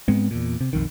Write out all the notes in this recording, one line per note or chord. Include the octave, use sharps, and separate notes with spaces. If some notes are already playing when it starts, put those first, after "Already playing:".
G#2 G#3 B3 C4
E2 A#2
C3
B1 F2 D#3